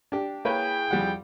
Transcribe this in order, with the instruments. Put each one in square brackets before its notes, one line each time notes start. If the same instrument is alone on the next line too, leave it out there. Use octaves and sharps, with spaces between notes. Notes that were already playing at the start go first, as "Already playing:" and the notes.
[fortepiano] D4 G4
[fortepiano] A#3 B4 C#5 [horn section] E4 G#4 G5
[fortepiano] F2 G3 F#5